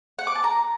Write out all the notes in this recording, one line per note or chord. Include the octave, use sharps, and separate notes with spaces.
F#5
D6
A5
A#5